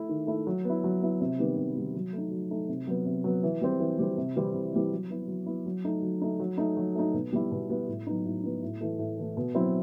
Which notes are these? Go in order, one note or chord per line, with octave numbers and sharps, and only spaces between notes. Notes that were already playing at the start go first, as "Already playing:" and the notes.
Already playing: A3 E4
D#3
A3 E4
F#3
B3
E4
F#3
B3 E4
C3
D#3 G3 B3
C3
D#3 G3 B3
F#3
A3 D#4
F#3
A3 D#4
C3
F#3 B3
C3
F#3 B3
E3
G3 C4
E3
G3 C4
C3
E3 G3 C4 E4
C3
E3 G3 C4 E4
F#3
B3 E4
F#3
B3 E4
F#3
A3 D#4
F#3
A3 D#4
F#3
A3 D#4
F#3
A3 D#4
B2
G3 B3 E4
B2
G3 B3 E4
A2
F#3 B3 D#4
A2
F#3 B3 D#4
A2
E3 A3
A2
E3 A3
B2
F#3 C4 E4